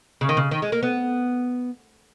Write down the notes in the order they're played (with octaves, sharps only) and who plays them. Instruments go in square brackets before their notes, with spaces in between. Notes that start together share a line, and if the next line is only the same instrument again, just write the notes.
[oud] C#3
D#3
C#3
D#3
G#3
A#3
B3